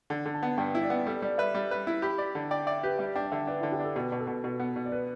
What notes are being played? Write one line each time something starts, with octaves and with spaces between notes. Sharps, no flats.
D3 A5
D3
A5
B3
G2 G5
E4
D5
B3
G3 A4
G3 D5
B4 E5
G3
B4
E4
G4 B5
D5
D3
D5 G5
D5 E5
G4 B4
G3 E5
D4 G5
D5
D3 E5
D4 B4
D3 E4
G4
D4 A4
B2 B4
B2
A4
B2
B2
B3
B2
D5
B4